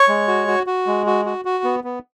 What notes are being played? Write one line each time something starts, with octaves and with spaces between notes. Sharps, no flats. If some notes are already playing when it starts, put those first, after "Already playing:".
Already playing: C#5 C#6
G#3
F#4
F#4
F#4
G#3
F#4
F#4
F#4
B3
B3